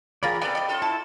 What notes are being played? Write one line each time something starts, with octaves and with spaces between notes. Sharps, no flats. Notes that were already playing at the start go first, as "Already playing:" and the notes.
E3 F4 G#4 A#4 D5 B5
B3 C4 A4 D5 G5 B5
G4 D#5
C#4 F4 A4
E4 A5